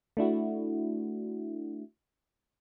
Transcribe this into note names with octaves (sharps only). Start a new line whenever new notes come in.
A3 D4 E4 F#4